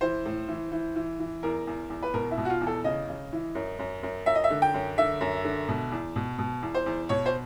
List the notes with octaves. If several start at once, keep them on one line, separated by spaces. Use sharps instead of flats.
E3 C5
A2
E3
E3
E3
E3
E2 A#4
E2
E2
B4
B2 A#4
E4
B2
F#4
F4
E2
A4
C#3 D#5
C#3
E3
F#2
F#2
F#2
F#2 E5
D#5
E5
D3
G5
F#2
D3 E5
F#2
D3
B2
E2
B2
B2
E2
C5
E2
B2 C#5
C5